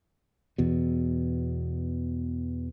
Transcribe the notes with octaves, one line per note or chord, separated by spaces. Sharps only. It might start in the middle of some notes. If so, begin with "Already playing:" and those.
E2 B2